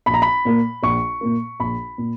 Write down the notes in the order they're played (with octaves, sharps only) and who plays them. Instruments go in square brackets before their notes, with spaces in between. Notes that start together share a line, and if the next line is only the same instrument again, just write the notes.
[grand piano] A#1 B5
A#5
B5
A#2 A#3
A#1 C#6
A#2 A#3
A#1 B5
A#2